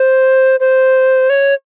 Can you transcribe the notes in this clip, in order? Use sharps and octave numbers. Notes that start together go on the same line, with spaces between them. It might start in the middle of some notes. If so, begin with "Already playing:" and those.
Already playing: C5
C5
C#5